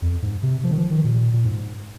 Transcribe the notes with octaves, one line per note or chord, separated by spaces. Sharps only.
F2
G#2
C3
F3
D#3
F3
D#3
A#2
A#2
G#2